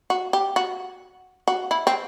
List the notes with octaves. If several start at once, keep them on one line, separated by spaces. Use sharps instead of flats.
F#4
G4
F#4
F#4
E4
C4